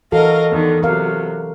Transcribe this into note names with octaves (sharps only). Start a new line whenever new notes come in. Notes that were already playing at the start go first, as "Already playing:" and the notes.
E3 F#4 A4 A#4 D#5 F5
E2 D3 D#3
C3 F#3 A#4 F5